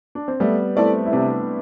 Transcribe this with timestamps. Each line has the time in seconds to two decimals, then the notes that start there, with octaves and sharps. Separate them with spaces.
0.15 D4
0.28 C4
0.40 G3 A3 B3
0.76 A3 C4 E4 A4 D5
1.06 E4
1.12 C3 B3 D4